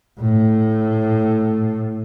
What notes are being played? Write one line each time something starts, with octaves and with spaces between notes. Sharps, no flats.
A2